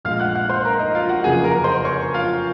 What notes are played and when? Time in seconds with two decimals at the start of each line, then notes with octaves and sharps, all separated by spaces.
0.05 A#1 A#2 G#3 F5 F6
0.20 F#5 F#6
0.35 F#5 F#6
0.49 C5 C6
0.65 A#4 A#5
0.79 D#4 D#5
0.95 F4 F5
1.09 F#4 F#5
1.24 F1 F2 C#3 F#3 A#3 G#4 G#5
1.44 A#4 A#5
1.64 C5 C6
1.84 C#5 C#6
2.14 F4 F5